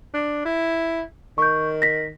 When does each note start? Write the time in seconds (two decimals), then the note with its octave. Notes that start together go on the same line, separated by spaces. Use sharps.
0.14 D4
0.45 E4
1.38 D#3 C#6 G6
1.82 A#6 B6